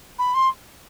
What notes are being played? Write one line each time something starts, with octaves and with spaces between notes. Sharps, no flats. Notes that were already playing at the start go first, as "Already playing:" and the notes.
B5
C6